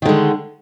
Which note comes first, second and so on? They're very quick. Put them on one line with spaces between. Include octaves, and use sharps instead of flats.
D#3 D3 G#3